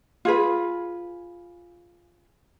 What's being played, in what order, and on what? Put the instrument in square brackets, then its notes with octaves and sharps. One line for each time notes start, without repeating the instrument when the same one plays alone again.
[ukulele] F4 G#4 B4